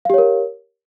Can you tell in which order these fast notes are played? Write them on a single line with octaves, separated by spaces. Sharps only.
F5 G4 C#5 A#4